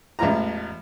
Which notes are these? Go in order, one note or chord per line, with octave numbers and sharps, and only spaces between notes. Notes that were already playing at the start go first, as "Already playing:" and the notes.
A1 E2 G#3 F4 A#5